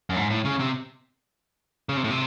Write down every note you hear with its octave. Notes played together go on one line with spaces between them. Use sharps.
F#2
G#2
A2
C#3
C3
C#3
C3
A2
C3